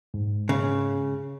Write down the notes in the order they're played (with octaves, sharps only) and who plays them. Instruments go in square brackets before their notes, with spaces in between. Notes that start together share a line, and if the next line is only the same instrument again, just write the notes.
[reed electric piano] G#2
[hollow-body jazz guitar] C#3